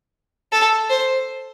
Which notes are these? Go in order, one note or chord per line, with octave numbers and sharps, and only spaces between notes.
A4
C5